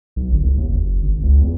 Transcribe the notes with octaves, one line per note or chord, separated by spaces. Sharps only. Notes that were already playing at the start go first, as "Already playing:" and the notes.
B1
G1
C2
D#2
F#1
G#1
C#2
E2